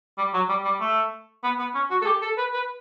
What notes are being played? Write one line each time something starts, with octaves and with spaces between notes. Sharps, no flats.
G3
F#3
G3
G3
A3
B3
B3
C#4
F#4
A4
G4
A4
B4
B4